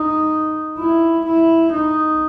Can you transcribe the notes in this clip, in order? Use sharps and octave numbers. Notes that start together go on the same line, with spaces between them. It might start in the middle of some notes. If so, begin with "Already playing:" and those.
Already playing: D#4
E4
E4
D#4